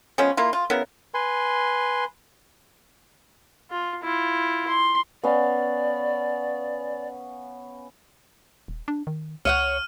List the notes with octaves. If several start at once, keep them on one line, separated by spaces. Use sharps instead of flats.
F3 G#3 B3 C#4
A#3 E4 F4
F4
C#3 B3 E4 A#4
B4 G#5 C6
F4
E4 F4
C6
B3 C#4 D5 F5
D#1
D4
D#3
C#2 C#5 E5 F#5 F6 D#7